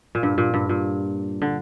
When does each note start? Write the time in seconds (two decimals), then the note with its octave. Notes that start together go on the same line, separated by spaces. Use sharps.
0.15 A#2
0.23 G2
0.38 A#2
0.54 G2
0.69 A#2
1.42 D3